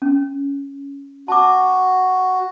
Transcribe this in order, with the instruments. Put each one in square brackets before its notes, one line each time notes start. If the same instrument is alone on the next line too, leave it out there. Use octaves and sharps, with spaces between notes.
[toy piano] C#4
[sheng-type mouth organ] F#4 [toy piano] A5 D6